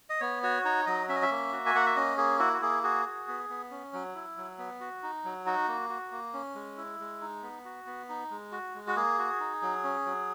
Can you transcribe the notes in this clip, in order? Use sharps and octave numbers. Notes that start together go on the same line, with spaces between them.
D#5
B3 C#5
F#4 C#5
D#4 C#5
F#3 D#5
C#4 E5
D#5
E5
A#3
F#4
G#5
A#3 F#5
E5
C#4 D#5
A#3 G#4
E4 F#4
F#4
A#3 G#4
F#4 G#4
F#4
B3
B3
C#4
F#3
E4
F#3
B3
F#4
D#4
F#3
D#4 F#4
A#3
F#4
A#3
C#4
G#3
E4
G#3
D#4
B3
F#4
B3
D#4
G#3
F#4
G#3
F#4
A#3 G#4
F#4
D#4
F#3
C#4
F#3